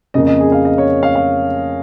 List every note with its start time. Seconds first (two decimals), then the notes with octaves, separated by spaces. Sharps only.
0.14 F2 C#3 A#3 D#5
0.27 D#5
0.40 G#4
0.52 F5
0.65 D#5
0.78 C#5
1.03 F5
1.15 F5